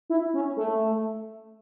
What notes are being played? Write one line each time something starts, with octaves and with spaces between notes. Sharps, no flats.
E4
C#4
A3